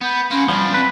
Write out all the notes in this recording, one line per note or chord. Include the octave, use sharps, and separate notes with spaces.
B3 B5 G6
A#3 C#4 F#4 F5 B5 C6
E2 F3 G3 D4
C4 B4